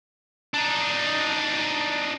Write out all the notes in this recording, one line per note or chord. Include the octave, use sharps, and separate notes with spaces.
D4 D#4